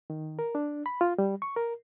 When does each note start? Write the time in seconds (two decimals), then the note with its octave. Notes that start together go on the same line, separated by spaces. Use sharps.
0.10 D#3
0.39 A#4
0.55 D4
0.86 B5
1.01 F4
1.18 G3
1.42 C#6
1.56 A#4